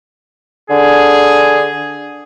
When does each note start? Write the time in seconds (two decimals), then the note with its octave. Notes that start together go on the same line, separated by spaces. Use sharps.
0.70 D3 G#4